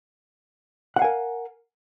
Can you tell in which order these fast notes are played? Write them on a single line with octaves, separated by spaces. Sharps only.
F#5 F5 G#5 A#4